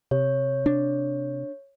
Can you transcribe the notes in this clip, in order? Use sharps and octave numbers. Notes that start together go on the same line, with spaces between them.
C3 C#5
D4